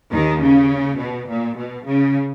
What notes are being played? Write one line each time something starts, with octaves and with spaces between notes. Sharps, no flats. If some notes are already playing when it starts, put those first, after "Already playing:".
D#2 D#3
C#3
B2
A#2
B2
C#3